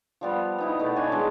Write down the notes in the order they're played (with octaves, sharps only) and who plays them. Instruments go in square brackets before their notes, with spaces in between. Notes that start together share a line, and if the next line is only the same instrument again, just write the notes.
[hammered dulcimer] F3 G3 B3
B3 D#4 E4
B2 A3 B3
D4 C#5 G#5
G#3 D4 A4